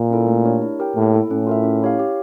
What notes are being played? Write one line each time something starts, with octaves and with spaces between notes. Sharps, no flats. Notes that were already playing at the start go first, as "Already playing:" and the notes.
Already playing: A#2
C#4 E4 A4
A3
D4 G4 A#4 C#5
E4
G4 A#4 C#5 G5
A2 A#3
E4 A4
A2 C#4
F4 A#4 E5
C#4
E4 G4 C#5 F5
G4